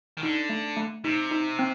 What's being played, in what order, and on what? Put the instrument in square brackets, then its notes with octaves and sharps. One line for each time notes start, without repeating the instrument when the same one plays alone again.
[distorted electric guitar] D#3
[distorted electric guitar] D3 [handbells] D#4
[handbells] A3
A3
[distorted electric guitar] C3 [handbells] D#4
[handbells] D#4
C4